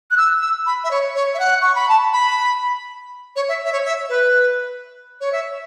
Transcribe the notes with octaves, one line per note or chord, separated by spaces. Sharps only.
F#6
E6
E6
B5
E5
C#5
C#5
E5
F#5
C#6
B5
A5
B5
C#5
E5
E5
C#5
E5
B4
C#5
E5